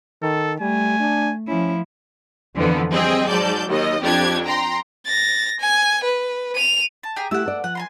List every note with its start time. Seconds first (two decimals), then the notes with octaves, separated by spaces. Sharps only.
0.23 D#3 A4
0.60 G3 A3 G#5
1.00 D4
1.48 F3 C#4 E4
2.55 F2 D3 E3 F3 B3
2.91 G3 C4 G#4 D#5 G5
3.28 G#2 F#3 D5 A5 G6
3.68 D#2 D#5
4.01 F2 D4 G4 G#6
4.45 G5 A#5 C6
5.06 A6 A#6
5.60 G#5
6.04 B4
6.55 D#7 F7
7.03 A5
7.16 G4 G#4 A#5
7.31 A3 E4 G4 F#5 E6
7.46 A4 D5
7.64 F3 F#5
7.75 G#5 A#5 C6